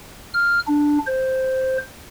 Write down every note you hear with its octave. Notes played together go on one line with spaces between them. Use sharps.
F6
D4
C5